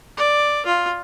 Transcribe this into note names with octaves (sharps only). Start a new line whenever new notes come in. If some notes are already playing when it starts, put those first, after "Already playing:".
D5
F4